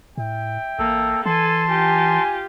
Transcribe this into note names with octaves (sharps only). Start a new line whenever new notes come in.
A2 E5 G5
A1 A#3 A4
E3 A4 G#5 A5 C6
F4 G4 G#5